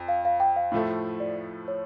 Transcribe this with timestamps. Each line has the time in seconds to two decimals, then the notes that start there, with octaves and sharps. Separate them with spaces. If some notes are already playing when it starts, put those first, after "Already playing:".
Already playing: F2
0.08 F5
0.25 F5
0.40 G5
0.56 F5
0.72 A2 F3 A3
1.20 D5
1.68 C#5